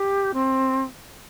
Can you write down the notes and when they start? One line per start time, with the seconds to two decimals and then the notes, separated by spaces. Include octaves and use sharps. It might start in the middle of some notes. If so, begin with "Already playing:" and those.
Already playing: G4
0.33 C4